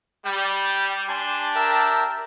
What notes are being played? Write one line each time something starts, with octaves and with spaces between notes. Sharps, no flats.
G3 G5
D4 G4 G#5 A5 C6
A#4 E5 G5